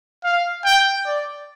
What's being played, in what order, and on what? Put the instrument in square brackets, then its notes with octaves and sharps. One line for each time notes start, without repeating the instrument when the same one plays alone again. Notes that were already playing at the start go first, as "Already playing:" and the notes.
[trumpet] F5
G5
D5